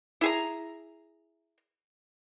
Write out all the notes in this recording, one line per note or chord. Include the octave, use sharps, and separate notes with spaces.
E4 G#4 A#5